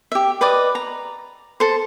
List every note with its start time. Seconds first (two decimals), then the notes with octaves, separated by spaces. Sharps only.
0.12 G4 E5
0.41 B4 D5 D#5 D6
0.75 A#5
1.60 A4 C5